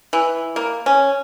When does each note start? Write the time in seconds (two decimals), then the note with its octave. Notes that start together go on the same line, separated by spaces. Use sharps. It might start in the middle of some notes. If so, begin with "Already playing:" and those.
0.13 E3
0.56 A#3
0.86 C#4